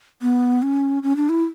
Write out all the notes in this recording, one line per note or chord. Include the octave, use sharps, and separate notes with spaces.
B3
C#4
C#4
D4
E4